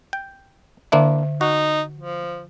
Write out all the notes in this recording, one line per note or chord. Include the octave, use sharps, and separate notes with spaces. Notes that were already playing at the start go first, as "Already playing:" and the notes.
G5
D3 A#3 D4 E4 E5
D#4 F#4
F3